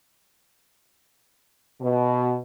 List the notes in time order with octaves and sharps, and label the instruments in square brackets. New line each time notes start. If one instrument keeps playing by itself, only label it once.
[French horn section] B2